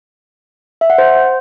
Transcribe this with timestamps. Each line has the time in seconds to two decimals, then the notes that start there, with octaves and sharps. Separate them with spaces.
0.81 E5
0.90 F#5
0.98 C5